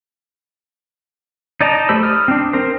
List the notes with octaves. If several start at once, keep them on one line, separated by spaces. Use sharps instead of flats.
D#4 D5 D#5 A5 A#5
A3 G4 C5 B5 E6
D#6 F6
C4 D4
C4 A#4 C5